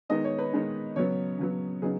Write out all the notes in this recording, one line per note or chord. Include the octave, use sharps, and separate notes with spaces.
D#3 G#3 B3 D#4 D#5
C#5
B4
D#3 G#3 B3 D#4
C#3 F#3 B3 C#5
C#3 F#3 B3
C#3 F#3 B3 D#4 G#4